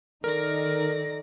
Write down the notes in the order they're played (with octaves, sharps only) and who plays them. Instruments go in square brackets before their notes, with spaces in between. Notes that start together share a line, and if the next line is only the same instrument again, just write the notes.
[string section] D#3 D#4 [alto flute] A4 [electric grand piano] A#4 [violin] D5 A#6